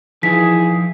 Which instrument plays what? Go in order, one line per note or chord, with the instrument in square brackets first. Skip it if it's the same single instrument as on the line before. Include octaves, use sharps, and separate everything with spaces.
[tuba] E3 [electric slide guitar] F3 D#4 E4 [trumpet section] G#4 [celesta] B6